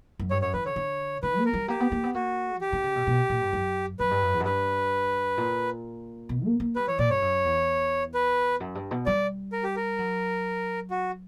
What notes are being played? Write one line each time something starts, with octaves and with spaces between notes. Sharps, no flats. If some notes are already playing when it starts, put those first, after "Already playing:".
F#2
G2 C#5
F#2 C#5
E3 B4
D3 C#5
D3
D3 B4
A#3
A#4
G3
A#3 G4
B3
A#3
B3
A#3 F#4
D3 G4
D3
C#3
B2
B2
A#2
G2
F#2
F#2 B4
G2
F#2
E2
F#2
G2 B4
A#2
B2
A#3
A#3
G3 B4
E3 C#5
A#2 D5
G2 C#5
F#2
E2
B4
F#2
G2
B2
G3 D5
A#4
G4
A#4
F#3
F#4